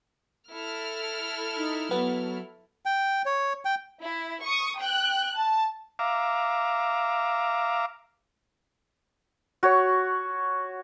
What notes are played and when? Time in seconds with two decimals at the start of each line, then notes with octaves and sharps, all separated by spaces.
0.51 E4 A4 F6
1.57 D#4
1.91 F#3 B3
2.86 G5
3.25 C#5
3.65 G5
4.01 E4
4.42 C#6 D#6
4.79 G5 F#6
5.35 A5
5.99 E5 F5 A#5 D6
9.63 F#4 C#5